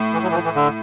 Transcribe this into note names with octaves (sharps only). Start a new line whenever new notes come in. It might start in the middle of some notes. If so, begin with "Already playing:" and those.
Already playing: A2
E3
F#3
E3
F3
E3
D3